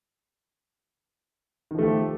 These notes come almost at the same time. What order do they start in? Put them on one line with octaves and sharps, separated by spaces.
D#3 F3 A3 G4